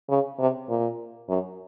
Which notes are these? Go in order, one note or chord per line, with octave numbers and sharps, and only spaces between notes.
C#3
C3
A#2
F#2